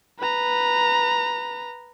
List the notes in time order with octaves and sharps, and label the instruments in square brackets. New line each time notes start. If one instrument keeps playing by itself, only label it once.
[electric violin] B4 A#5